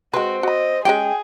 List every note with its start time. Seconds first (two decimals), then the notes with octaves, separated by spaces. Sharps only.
0.14 G#3 C4 F#4 B4
0.43 F#4 D#5 B5
0.85 G#3 C#4 G4 G#4 G5